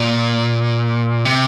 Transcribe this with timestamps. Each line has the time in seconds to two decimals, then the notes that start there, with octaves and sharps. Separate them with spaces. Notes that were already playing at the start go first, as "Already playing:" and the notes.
Already playing: A#2
1.25 C3